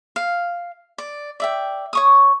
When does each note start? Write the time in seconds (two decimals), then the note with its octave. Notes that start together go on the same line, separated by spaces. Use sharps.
0.16 F5
0.98 D5
1.40 D5 E5 G5
1.93 C#5 C#6 D#6